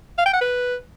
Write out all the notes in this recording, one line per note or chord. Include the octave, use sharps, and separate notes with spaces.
F5
G5
F#5
B4